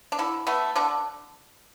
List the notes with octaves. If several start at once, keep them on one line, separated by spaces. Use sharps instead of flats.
D4
D3 E4
A3 B3
D3 D4